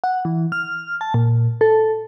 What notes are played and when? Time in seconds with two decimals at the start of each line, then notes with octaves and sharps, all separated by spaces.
0.04 F#5
0.25 E3
0.52 F6
1.01 A5
1.14 A#2
1.61 A4